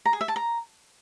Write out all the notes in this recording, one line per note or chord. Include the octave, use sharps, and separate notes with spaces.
A#5
G#4
E5
A5
A#5